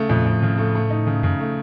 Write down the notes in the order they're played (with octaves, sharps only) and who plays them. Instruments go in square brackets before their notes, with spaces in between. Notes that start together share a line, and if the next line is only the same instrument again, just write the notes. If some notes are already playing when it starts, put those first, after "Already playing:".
Already playing: [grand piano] C#3 A3
[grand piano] F2 [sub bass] A#2
[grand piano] F2 [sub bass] A2
[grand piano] C#3
A3
A3
D#4
C#3
[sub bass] F#2 [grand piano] C#3
[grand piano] A3